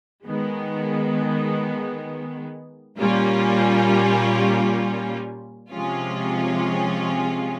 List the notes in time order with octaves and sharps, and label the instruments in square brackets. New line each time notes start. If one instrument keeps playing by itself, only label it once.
[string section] D#3 G#3 B3
A#2 G3 A#3 C#4 F4
C3 F3 G#3 C#4 F4